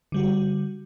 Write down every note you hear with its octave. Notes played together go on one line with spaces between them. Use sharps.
D3 G3 F#4